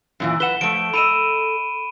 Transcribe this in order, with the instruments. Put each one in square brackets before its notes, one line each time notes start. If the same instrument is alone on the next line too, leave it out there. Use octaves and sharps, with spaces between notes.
[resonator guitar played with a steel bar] F#2 A#2 E3
[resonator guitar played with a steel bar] B4 F#5 [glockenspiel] E7 G7
[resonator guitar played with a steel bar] F3 A3 [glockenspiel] D7
[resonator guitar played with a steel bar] A4 D#5 [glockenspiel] B5 D#7 E7